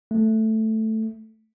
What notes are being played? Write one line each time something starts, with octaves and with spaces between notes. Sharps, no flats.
A3